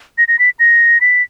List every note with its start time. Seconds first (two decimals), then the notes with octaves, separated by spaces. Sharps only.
0.18 A#6
0.28 A#6
0.39 B6
0.59 A#6
1.01 B6